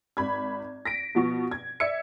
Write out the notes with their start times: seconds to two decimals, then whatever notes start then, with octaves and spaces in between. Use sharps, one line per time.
0.17 G#1 B5 G#6
0.85 A#6 B6 D7
1.15 B2 F3 B3 C#6
1.51 G#6
1.80 D5 E5 E6 G#6 C#7